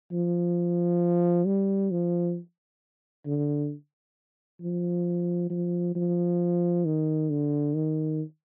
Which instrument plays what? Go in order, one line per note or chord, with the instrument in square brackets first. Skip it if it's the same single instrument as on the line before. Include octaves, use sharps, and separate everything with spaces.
[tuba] F3
G3
F3
D3
F3
F3
F3
D#3
D3
D#3